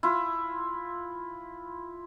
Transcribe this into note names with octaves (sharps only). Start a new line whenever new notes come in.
E4 F4